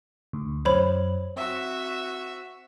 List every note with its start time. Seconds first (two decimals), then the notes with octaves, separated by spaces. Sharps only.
0.33 D2
0.65 F#2 C5 C#5 B5
1.36 C4 F#4 E5